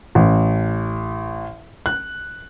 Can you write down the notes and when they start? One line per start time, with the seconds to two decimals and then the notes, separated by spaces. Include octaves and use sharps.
0.15 A1
1.86 F#6